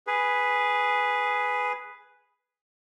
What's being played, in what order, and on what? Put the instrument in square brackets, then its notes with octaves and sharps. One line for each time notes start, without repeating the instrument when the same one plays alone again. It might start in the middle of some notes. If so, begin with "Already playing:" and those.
[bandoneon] G#4 B4